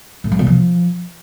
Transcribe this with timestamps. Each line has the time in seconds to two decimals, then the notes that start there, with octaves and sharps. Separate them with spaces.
0.24 A2
0.32 F#3
0.39 B2
0.47 F3